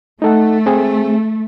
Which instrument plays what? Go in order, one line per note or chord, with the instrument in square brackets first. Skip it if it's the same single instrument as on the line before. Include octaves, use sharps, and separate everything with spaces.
[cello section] A3 [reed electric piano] D#4 A4 F#5
[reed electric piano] C4 G#4